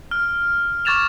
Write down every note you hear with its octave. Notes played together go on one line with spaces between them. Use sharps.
F6
C#6 D6 G#6 A6 E7 F7